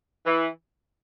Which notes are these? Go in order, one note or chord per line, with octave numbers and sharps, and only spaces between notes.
E3